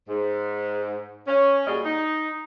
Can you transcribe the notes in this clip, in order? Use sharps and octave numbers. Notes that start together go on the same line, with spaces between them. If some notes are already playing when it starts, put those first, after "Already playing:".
G#2
C#4
A#2 G3 F#4 G#4 D#5
D#4